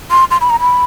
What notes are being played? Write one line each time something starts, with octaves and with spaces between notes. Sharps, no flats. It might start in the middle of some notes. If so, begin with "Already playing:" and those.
C6
C6
B5
A#5
B5